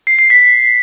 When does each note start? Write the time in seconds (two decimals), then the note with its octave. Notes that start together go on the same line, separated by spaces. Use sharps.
0.07 C7
0.19 C7
0.30 B6